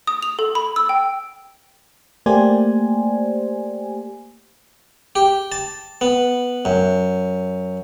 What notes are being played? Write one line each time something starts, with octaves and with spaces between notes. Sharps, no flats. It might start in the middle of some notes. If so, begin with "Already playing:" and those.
D#6
F7
A4
B5
E6
G5
A3 A#3 G4 C5 D5 G#5
G4
A5
B3
F#2